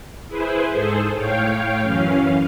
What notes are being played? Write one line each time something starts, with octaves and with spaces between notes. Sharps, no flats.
E4 G#4 B4 C5
G#2 G#4 A4 C5
A2 C#5 F5 G5 G6
F#2 E3 C#4 F5